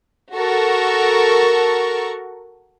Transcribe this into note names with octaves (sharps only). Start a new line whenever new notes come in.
F#4 A4 A#4 C#6